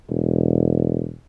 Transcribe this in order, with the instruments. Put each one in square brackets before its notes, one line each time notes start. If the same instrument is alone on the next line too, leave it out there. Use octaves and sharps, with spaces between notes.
[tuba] E1